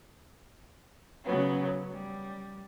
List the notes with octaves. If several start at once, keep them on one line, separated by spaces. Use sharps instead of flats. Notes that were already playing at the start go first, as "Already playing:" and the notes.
C#3 F#3 B3 C#4
G3